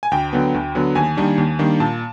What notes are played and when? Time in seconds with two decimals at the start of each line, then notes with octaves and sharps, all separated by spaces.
0.03 G#5
0.11 D2 G5
0.33 D3 F#3 B3
0.54 D2
0.75 D3 F#3 B3
0.95 D#2 G#5
1.17 D#3 G3 A#3 D4
1.38 D#2
1.59 D#3 G3 A#3 D4
1.80 A#2 A5